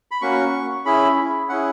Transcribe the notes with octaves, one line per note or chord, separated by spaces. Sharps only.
B5
A#3 C#4 F#4 C#6
C#4 E4 G#4 B5
C#4 E4 G#4 F#5